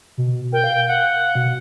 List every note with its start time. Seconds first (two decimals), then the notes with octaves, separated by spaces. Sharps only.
0.17 B2
0.53 A#4 G5
0.64 F5
0.88 F5 F#5
1.35 B2